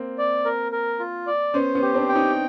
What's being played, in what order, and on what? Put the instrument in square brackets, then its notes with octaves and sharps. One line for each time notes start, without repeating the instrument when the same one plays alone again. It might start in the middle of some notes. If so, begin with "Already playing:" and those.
Already playing: [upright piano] A#3 C4
[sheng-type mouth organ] D5
A#4
A#4
F4
D5
[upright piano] B3 C#4 [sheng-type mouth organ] C5
[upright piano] B3 C#4
[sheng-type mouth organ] G4
[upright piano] C4 D4
[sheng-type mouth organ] G5
[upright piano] C#4 D#4